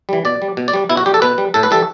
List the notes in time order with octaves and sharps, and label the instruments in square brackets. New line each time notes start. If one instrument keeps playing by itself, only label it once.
[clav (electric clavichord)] E3 G3
B2 D5
G3
B2
D5
G3
B2 E4
F#4
G3 G4
A4
B2 B4
G3
A2 A4
B4
E3 G3 A4